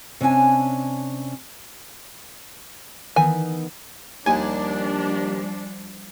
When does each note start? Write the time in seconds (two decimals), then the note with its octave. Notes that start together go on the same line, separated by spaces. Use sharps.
0.21 C3 C#4 D4 D5 G#5 A5
3.16 D#3 E3 B3 G#5
4.26 D#2 F3 G3 D4 G#5